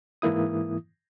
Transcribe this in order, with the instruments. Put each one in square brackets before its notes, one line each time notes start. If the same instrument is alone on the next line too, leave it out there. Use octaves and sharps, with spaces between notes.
[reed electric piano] G#2 E3 A#3 E4 D#6